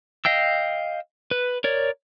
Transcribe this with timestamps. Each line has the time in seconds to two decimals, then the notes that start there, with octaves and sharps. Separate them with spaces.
0.25 D#5 F5 G5 E6
1.31 B4
1.64 A#4 C#5 D5